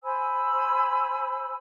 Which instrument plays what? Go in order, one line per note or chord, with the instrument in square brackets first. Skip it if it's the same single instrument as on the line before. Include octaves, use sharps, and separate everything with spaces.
[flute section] C5 G#5 B5 E6